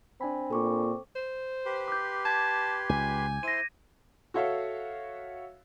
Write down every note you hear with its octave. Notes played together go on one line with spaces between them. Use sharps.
C4 D4 G#5 B5
A#2 A4 C#6 D6
C5
G4 B4 C6
D6 G6
A5 G#6
C#2 G#5
E4 C5 C6 A#6 D#7
F#4 A4 C#5 E5 F5